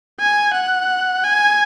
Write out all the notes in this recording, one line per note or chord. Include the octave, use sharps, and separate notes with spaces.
G#5
F#5
G#5